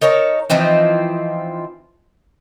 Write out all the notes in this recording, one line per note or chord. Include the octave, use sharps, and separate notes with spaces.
D#4 A#4 C#5 A5
E3 F3 C4 D#4